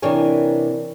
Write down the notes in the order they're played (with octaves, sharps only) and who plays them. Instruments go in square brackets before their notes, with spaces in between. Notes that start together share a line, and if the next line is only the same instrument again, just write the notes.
[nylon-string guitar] C3 E3 D4 A#4 C#5 G#5